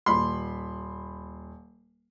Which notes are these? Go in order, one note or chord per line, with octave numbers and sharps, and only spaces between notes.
D#1 B5 C6